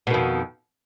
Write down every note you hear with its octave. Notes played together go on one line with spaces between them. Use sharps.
F2 B2 D#3